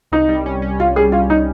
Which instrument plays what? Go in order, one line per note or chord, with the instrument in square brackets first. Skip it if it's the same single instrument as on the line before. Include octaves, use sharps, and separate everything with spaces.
[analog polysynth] C2 [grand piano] D#4
[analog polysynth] G3
C#4
C#4
[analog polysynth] C#4 [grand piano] F4
[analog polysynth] G3 [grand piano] G#4
[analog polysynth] C#4 [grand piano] F4
[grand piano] D#4